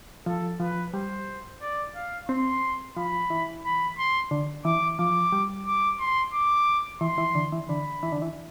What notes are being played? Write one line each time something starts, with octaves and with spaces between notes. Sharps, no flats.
F3 A4
F3 B4
G3 C5
D5
F5
C4 C6
F3 B5
E3
B5
C6
D3
E3 D6
F3 D6
G3
D6
C6
D6
E3 C6
E3
D3
E3
D3 B5
E3
D3
E3